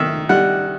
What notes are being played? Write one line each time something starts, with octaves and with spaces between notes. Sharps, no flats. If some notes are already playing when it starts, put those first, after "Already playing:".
Already playing: D#3 E5
G3 F#5